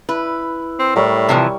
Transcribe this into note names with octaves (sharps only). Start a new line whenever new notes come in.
E4 B4
C4
A2 G3 A#4 C#5
C3 E3 F3